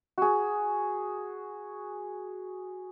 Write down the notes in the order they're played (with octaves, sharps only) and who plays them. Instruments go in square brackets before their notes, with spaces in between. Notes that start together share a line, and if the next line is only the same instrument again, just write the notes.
[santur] F#4 G#4